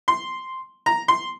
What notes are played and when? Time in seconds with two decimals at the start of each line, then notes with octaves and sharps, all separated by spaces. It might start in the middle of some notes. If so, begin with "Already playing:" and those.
0.08 C6
0.86 A#5
1.08 C6